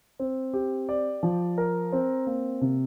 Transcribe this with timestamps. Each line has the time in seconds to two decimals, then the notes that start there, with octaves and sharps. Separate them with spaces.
0.20 C4
0.54 G4
0.89 D5
1.23 F3
1.58 A#4
1.93 C4
2.27 A#3
2.61 C3